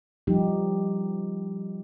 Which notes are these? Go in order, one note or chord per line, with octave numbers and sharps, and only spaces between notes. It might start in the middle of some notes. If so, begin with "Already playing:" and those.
F3 G3 D#4 G4